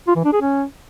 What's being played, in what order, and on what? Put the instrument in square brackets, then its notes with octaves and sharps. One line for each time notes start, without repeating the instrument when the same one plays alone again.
[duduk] F4
E3
D4
G#4
C#4